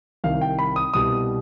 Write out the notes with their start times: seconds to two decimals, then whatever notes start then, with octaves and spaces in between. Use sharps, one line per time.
0.24 C2 C3 D#3 F5
0.41 G5
0.59 B5
0.76 D#6
0.94 C2 B2 G3 D#6